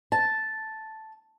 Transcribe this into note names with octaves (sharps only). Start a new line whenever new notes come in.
A5